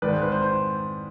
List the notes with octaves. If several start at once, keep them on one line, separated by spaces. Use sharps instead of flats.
G#2 D#3 G#3 B4 D5
C5
B4
C5
C5